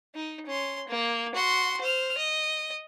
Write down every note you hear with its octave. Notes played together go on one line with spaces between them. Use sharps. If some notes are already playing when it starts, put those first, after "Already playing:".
D#4
C#4 C6
A#3
F#4 C6
C5 F6
D#5